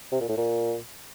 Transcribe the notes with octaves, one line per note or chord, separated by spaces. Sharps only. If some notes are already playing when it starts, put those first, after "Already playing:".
C3
A#2
A2
A#2